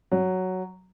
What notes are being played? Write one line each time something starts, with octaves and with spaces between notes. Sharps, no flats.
F#3